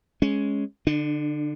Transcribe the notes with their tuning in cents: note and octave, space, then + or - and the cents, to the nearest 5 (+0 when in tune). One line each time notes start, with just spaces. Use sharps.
G#3 +5 C#4 +0
D3 +0 D4 +35